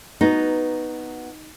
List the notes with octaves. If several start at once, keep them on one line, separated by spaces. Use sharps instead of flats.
B3 D#4 F#4 A#5